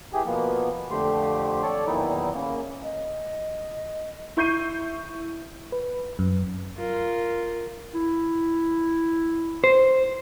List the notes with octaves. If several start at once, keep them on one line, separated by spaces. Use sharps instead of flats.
E3 G4 G#4
B2 F3 A#3 B3
F2 D3 F3 A3 G4 C6
A4 C#5 D5
E2 A#2 D#3 F#3 D#4 E4
C#3 A#3
D#5
E4 C#6 G6 C7 D#7
B4
F#2
F4 A#4
E4
C5